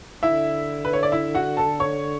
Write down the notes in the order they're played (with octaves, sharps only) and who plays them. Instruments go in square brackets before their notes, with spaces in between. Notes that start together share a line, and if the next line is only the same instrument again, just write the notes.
[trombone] D3 [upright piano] E4 E5
[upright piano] B4
C#5
D5
E4 E5
F#4 F#5
A4 A5
C#5 C#6